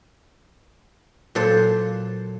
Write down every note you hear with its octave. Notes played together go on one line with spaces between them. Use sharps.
A#2 F#3 A4 C5